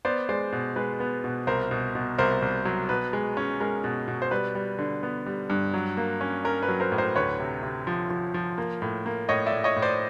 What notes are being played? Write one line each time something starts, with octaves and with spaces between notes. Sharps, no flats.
B3 C5 D5
G#3 C5 D5
B2
G#3 B4
B3
B2
C2 A#4 C5
B2
B2
C2 A#4 C5
C2
F#3
B2 B4
G#3
C#4
G#3 A#4
B2
B2
C5
G3 B4
G3
D3
B3
G3
G2
F#3
A#3
C#4
C#4 A#4
B4
F#3
A#4 C5
A2
A#4 C5
D2 B4 C#5
C3
C3
F3
F3
F3
A#3
A2
A#3
A2 C#5 D#5
D5 E5
A2
C#5 D#5
A2
C5 D5